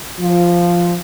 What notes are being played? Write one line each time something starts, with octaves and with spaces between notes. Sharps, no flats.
F3